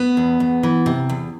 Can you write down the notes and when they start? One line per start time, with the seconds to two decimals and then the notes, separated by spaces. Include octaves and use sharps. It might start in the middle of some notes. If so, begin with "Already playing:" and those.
Already playing: B3
0.17 E2
0.40 E2
0.63 E3
0.86 C3
1.09 E2